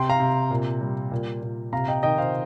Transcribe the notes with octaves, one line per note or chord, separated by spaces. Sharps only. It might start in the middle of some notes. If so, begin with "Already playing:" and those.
Already playing: C3 G5 C6
F5 A#5
C3
A#2
G3
A#2
A#2
C3 F5 A#5
D#5 G5
D#3 D#5 G5
C5 F5